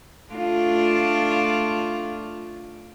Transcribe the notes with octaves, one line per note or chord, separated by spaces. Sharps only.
A3 D4 F4